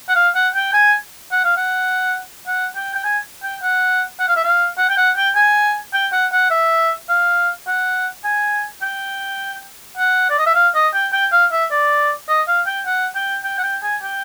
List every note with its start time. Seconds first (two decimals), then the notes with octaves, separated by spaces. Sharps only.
0.09 F#5
0.15 F5
0.35 F#5
0.55 G5
0.73 G#5
1.32 F#5
1.44 F5
1.57 F#5
2.47 F#5
2.76 G5
2.95 G5
3.05 G#5
3.43 G5
3.62 F#5
4.19 F#5
4.28 F5
4.36 E5
4.44 F5
4.78 F#5
4.89 G5
4.97 F#5
5.16 G5
5.36 G#5
5.93 G5
6.13 F#5
6.32 F#5
6.51 E5
7.09 F5
7.67 F#5
8.24 G#5
8.82 G5
9.97 F#5
10.30 D5
10.38 D#5
10.46 E5
10.55 F5
10.74 D#5
10.94 G5
11.13 G5
11.32 F5
11.52 E5
11.71 D5
12.28 D#5
12.48 F5
12.67 G5
12.86 F#5
13.15 G5
13.44 G5
13.58 F#5
13.63 G5
13.82 G#5
14.02 G5